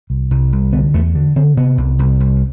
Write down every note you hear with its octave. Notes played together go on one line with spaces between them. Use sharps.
C2
C2
C2
D3 B3
E2 A3
D3
D3 C4
C3 B3
C2
C2
C2